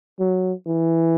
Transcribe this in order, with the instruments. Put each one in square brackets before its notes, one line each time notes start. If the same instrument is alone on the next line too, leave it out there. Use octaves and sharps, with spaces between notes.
[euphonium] F#3
E3